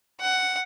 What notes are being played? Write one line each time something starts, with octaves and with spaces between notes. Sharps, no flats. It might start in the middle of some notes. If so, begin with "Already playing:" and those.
F#5